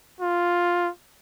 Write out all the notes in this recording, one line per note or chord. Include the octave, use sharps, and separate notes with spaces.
F4